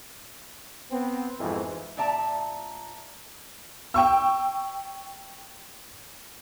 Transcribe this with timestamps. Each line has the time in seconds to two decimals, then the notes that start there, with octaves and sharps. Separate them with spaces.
0.90 B3 C4
1.39 F2 G#2 B2 E3
1.97 A#2 D5 E5 A5 A#5
3.94 G5 C#6 E6